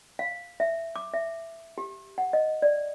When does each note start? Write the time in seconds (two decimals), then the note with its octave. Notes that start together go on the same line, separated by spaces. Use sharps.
0.19 F5
0.60 E5
0.96 D6
1.14 E5
1.78 G4
2.18 F#5
2.33 D#5
2.62 D5